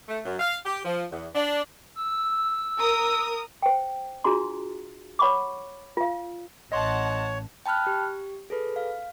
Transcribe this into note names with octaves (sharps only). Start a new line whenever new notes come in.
A3
F#2
F5
G4
F3
E2
D4
E6
A#4 D#6
C5 G5
D4 F4 F#4 G#4 A#5 C6
C#5 F#5 B5 C#6 D6
F4 F5
A1 C#5 D#5 F#5 A5 C6
G5 A5 B5 F6 F#6
G4
G#4 A4 B4
F5